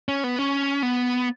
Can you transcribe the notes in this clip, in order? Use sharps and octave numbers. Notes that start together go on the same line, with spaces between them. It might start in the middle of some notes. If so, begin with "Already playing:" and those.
C#4
B3
C#4
B3